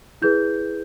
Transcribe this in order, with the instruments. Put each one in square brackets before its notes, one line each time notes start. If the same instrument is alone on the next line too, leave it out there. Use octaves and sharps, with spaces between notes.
[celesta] E4 G#4 B4 G6